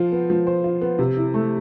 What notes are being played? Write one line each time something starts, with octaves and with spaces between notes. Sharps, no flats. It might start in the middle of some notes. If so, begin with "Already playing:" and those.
Already playing: F3 F4 C5
B3
F3
C5
F4
B3
C3
E4
A3